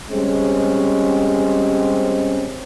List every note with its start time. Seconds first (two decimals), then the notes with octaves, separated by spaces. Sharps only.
0.11 G3 G#3 C4 C#4